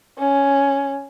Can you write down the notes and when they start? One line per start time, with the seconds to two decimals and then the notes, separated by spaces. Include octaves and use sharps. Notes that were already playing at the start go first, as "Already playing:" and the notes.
0.18 C#4